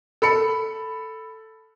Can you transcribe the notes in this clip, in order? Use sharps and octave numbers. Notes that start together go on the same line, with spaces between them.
A4 B5 C#7